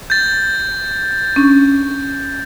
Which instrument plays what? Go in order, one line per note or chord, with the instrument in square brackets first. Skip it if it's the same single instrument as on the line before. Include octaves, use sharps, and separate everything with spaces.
[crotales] G6 A6
[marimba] C#4 D4 C#6